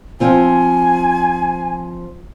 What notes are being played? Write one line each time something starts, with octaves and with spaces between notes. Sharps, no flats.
F3 C4 F4 G#5